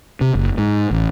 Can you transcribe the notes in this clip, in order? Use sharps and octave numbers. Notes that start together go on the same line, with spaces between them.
C3
F#1
G#2
A1